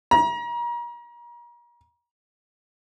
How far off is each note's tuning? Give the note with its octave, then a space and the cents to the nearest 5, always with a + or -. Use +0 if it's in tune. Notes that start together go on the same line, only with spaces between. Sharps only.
A#5 +35